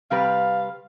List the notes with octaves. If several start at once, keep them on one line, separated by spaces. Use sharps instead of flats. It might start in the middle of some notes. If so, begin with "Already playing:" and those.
C3 G3 B4 F5